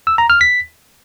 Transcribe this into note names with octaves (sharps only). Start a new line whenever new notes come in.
E6
A#5
F6
B6